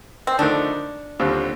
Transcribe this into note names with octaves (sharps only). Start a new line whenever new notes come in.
C4
D3 F3 A3 D4 D#4 A#4
D#2 D3 G3 C4 F4